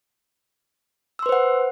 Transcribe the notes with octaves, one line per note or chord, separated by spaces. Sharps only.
B4 C5 F#5 C6 E6